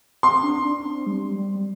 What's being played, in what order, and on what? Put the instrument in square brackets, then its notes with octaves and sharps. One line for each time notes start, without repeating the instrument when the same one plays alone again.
[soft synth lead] C4 [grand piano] C6
[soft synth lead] D4
D4
C4
G3
G3
G3